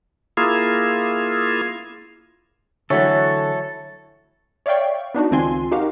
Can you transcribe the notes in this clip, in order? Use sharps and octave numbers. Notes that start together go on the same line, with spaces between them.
A#3 E4 F4 G#4
D3 E3 F#3 A3 A4 C#5
C#5 D5 E5 F5 G5 C#6
B3 D4 D#4 F#4
C#2 D#3 C4 F4 G#5 C6
D#4 F#4 G4 A#4 F5